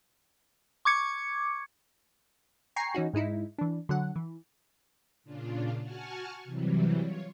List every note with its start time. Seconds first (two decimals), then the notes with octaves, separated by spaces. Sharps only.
0.85 C#6 D6 G#6 C#7
2.76 G5 G#5 A#5 C#6 C7
2.95 E3 C#4 D#4 F#4
3.13 G#2 G#3 D#4 E4
3.58 E3 D4
3.89 D3 F#3 F#5
4.16 E3
5.24 A#2 C#3 D4 F4
5.82 F#4 F#5 G#5 A5 C#6 F6
6.44 C3 E3 F#3 G3
7.00 F4 C#5